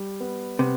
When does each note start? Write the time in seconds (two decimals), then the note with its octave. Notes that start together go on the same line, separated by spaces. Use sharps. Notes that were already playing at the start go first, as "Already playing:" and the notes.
Already playing: G3
0.20 B3
0.59 C3 B3